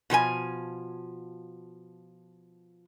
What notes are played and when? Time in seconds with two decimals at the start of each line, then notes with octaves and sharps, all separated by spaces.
0.10 B2 F3 C5 G#5